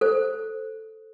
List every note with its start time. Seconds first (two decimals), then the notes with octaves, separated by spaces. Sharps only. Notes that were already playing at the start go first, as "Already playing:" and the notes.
0.01 A4 C5